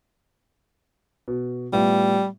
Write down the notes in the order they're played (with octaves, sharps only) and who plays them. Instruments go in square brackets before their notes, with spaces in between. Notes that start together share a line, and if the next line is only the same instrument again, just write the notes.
[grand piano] B2
[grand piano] A2 B3 F4 [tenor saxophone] G3